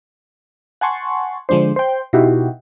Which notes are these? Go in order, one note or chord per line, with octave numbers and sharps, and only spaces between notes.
F#5 G#5 A5 C6 C#6
D3 F3 G#3 D4 C5
C5 G5
B2 D#4 E4 F#4 G4